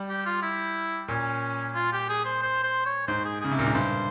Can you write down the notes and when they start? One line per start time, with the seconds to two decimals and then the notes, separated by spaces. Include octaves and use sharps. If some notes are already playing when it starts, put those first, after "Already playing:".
Already playing: G3
0.09 G4
0.26 F4
0.42 E4
1.08 A#2 C#4
1.75 F4
1.92 G4
2.09 G#4
2.25 C5
2.42 C5
2.64 C5
2.86 C#5
3.07 G#2 C5
3.25 G#4
3.41 C#3 G#4
3.51 C3
3.57 A#2 A#4
3.66 G#2
3.74 G2 C5